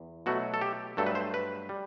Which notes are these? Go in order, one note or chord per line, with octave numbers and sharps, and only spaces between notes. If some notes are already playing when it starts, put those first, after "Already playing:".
Already playing: E2
B2 F#3 A3 F#4
A4
G4
G2 F#3 A3 A4
B4
C5
B4
G3